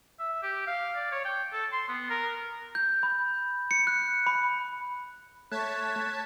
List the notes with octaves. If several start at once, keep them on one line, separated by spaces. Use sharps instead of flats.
E5
G4
F5
D5
C#5
G5
A4
C6
B3
A#4
G6
B5
C#7
F#6
B5
A3 C#5 A5 F#6 G#6 B6